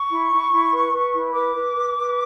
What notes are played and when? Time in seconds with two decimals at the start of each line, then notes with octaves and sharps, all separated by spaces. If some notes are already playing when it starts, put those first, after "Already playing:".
Already playing: C#6
0.09 E4
0.30 E4
0.50 E4
0.72 B4
0.92 B4
1.13 E4
1.33 B4 D6
1.54 B4
1.75 B4
1.96 B4